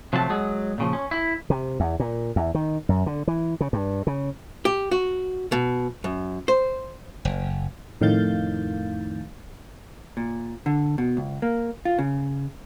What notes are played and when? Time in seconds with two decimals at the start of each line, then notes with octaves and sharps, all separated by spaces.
0.13 C3 F3 F#3 A3 D4 A5
0.30 F#3 G#3 G#4
0.78 A#2 C#3 F3
0.93 C#4
1.11 E4
1.50 C3
1.80 E2
2.00 A#2
2.36 E2
2.55 D#3
2.89 F#2
3.06 D3
3.28 E3
3.61 C#3
3.73 G2
4.07 C#3
4.65 G4
4.91 F#4
5.52 B2
6.04 F#2
6.48 C5
7.25 F#1
8.01 F2 A2 D#3 F5 G6 A6
10.17 A#2
10.66 D3
10.98 B2
11.17 C#2
11.42 A#3
11.85 F4
11.99 C#3